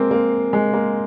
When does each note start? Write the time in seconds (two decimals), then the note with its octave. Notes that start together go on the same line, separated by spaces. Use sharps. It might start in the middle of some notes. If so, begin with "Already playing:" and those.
Already playing: G#3 A#3 C4
0.11 A#3
0.53 G#3
0.73 A#3